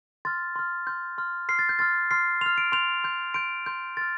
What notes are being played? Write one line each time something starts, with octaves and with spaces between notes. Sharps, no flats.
C6 F6 A6
C6 F6
C6 F6 G6
C6 F6
C6 F6 C7
A6
G6
C6 F6 A6
C6 F6 C7
C6 F6 F7
D7
C6 G6 F7
C6 G6
C6 G6 D7
C6 G6
C6 F6 A6